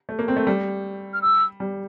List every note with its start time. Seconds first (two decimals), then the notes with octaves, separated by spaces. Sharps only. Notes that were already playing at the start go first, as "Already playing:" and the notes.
0.09 A3
0.19 A#3
0.28 C4
0.37 A3
0.47 G3
1.13 F6
1.22 E6
1.60 G3